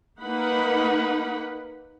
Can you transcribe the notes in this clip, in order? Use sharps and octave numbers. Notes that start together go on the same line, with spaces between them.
A#3 D#4 B4 F#5 B5